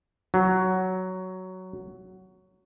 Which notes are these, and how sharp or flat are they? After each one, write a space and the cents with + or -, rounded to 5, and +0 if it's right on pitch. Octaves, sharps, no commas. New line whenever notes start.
F#3 +10